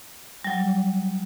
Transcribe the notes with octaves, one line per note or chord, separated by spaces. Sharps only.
F#3 G3